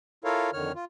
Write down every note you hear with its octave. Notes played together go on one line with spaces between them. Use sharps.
E4 F4 A4 A#4 C#5 F5
F2 D3 D#3 C#5 F6
F4